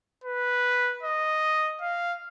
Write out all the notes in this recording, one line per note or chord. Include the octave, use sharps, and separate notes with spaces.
B4
D#5
F5